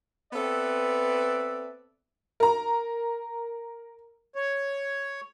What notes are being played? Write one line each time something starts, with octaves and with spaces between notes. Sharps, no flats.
B3 C4 A4 B4 D5 E5
A#4 A#5
C#5